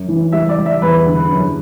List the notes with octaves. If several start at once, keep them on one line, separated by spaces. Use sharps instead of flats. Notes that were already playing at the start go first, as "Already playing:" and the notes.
Already playing: F#2
E3
G3 E5
D5
G3
E5
E2 B4
D3
F#2